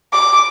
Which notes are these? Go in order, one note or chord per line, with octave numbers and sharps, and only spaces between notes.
D6